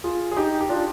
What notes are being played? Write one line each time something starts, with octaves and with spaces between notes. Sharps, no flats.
F4 G#4
G#4
D#4 G4
G4
D4 F4